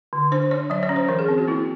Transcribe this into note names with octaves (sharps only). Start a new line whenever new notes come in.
D3
D4 C5
D4 C#5
F#3 D5
C#5
C#4
C5
E3 A#4
G#4
C4
F#4
A#3 E4